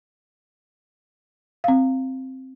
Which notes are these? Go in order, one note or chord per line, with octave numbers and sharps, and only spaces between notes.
C4 F5